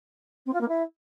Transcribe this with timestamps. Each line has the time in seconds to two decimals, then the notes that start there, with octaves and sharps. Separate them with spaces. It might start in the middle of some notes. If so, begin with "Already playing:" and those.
0.46 C4
0.53 F4
0.60 A#3
0.68 E4